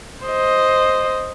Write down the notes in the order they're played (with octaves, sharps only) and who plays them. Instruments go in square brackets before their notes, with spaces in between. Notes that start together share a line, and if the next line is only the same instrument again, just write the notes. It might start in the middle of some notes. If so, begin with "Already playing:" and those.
[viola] C5 D#5